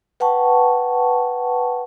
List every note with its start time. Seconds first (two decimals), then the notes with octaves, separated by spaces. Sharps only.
0.20 B4 F#5 G5 A5 C#6